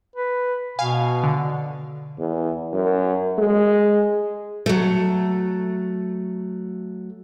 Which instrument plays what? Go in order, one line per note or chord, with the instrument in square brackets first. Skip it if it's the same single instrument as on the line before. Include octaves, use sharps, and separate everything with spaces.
[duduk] B4
[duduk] B2 [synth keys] F5 G#5
[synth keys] D3
[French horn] E2
F#2
G#3
[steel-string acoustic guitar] F#3 A3